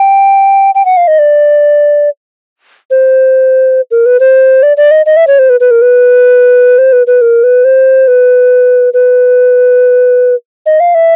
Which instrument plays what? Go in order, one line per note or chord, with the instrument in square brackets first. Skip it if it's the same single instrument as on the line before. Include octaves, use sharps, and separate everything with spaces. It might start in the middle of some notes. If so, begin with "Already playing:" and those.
Already playing: [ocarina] G5
G5
F#5
F5
D#5
D5
C5
A#4
B4
C5
D5
D5
D#5
D#5
E5
C#5
C5
B4
B4
A#4
B4
C5
B4
B4
A#4
B4
C5
B4
B4
D#5
F5
E5